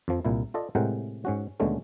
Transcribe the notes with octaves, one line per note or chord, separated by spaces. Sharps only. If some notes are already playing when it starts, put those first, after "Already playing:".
F2 F3
C2 A#2 E4
F4 A4 D5 D#5
A2 C3 G#3 A#4 F#5 G5
G#2 C#4 F#4
D#2 B2 D3 G#3 A3 C#4